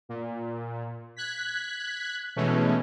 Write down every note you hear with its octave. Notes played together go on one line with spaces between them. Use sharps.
A#2
F#6 G#6 B6
B2 E3 G#3 A3 C#4